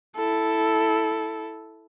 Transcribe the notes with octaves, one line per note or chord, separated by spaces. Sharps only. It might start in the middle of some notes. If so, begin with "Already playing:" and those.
E4 A4